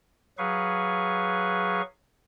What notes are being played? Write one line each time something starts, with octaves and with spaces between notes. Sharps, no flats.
F#3 G#4 B4 F5 C#6